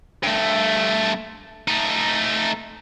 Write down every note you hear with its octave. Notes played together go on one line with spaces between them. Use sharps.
G2 A3
A3 D#4